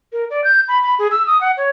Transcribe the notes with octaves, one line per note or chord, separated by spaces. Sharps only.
A#4
D5
G6
B5
B5
G#4
E6
D#6
F#5
C#5